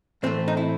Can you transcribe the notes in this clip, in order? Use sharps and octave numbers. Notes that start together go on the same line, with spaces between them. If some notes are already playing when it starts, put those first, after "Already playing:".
A2 E3 A3 C4
D#4
E4